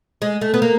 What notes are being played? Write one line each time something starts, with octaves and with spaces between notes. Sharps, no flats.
G#3
A3
B3
A#3